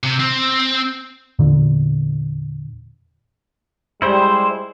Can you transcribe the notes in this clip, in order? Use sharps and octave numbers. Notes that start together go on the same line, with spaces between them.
C3
C4
E2 A#2 D3
G3 G#3 E4 C5